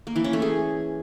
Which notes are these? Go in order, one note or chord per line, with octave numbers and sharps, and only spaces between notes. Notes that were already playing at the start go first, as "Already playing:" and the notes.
A#3
E3
C#4
A3
G#4